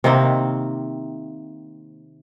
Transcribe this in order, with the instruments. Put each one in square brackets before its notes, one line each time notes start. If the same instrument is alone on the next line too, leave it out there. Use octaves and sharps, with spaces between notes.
[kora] C3 D#3 A#3 C4